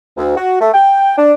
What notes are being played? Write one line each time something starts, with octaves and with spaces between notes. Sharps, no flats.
D2
F#4
A3
G5
D4